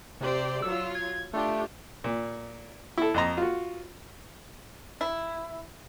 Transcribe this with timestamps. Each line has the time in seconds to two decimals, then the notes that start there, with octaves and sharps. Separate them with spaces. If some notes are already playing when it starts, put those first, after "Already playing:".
0.21 C3 G4 C5 D5
0.62 F#3 F4 E6
0.95 G#6
1.33 A3 D4 F4 G4
2.04 A#2
2.98 E4 A4
3.14 F2 D#5 A#5
3.37 F4 F#4
5.01 E4